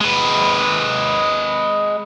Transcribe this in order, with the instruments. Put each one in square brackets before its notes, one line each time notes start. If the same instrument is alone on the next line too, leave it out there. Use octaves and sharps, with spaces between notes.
[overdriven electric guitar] G#3 B4